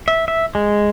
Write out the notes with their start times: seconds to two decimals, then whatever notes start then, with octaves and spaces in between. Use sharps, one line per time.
0.08 E5
0.28 E5
0.55 G#3